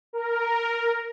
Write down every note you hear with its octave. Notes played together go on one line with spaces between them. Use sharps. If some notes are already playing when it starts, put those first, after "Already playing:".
A#4